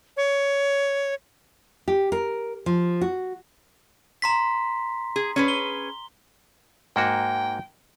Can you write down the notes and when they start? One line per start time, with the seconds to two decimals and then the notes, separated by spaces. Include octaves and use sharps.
0.17 C#5
1.88 G4
2.12 A#4
2.66 F3
3.01 F#4
4.22 A#5 C6 B6
5.16 G#4
5.36 C#4 G#4 B4
5.48 G7
6.96 G#2 A#3 F#4 G5